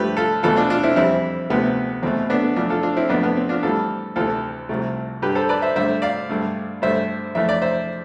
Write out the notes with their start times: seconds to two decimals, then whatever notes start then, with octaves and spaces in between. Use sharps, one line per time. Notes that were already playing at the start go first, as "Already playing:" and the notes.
Already playing: G2 F3 A3 G4 B4
0.17 F4 A4
0.43 E2 B2 A3 F4 A4
0.56 D4 F4
0.70 D4 F4
0.83 C4 E4
0.96 F2 E3 G3 C4 E4
1.50 D2 C3 F3 A3 B3
2.03 E2 B2 A3 C4
2.30 B3 D4
2.56 F2 E3 A3 D4 F4
2.70 F4 A4
2.83 D4 F4
2.97 C4 E4
3.09 F2 D3 F3 A3 B3 D4
3.23 B3
3.37 C4
3.49 D4 F4
3.63 A2 E3 G3 F4 A4
4.16 D2 C3 E3 F4 A4
4.69 C2 C3 F3 A3
5.22 G2 D3 G3 G4 B4
5.35 A4 C5
5.49 B4 D5
5.62 C5 E5
5.76 G2 D3 A3 C5 E5
6.02 D5 F5
6.29 G2 D3 A3
6.82 G2 D3 A3 C5 E5
7.35 F2 E3 A3 E5
7.49 D5
7.62 C5 E5